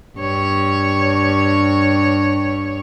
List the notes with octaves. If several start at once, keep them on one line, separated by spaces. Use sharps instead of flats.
G2 C#5